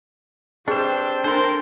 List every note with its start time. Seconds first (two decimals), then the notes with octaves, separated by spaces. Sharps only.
0.68 C4 D4 G4 G#4 B4 C5
1.24 D4 A4 A#4 C5 C6